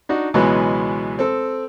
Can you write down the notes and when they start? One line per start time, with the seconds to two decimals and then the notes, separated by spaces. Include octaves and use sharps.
0.09 D4 D#4 F#4
0.34 C#2 B2 E3 F#3 G#3 B3
1.19 C4 A4